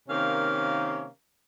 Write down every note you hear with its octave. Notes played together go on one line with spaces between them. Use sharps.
C3 D#3 A#3 C#4 F5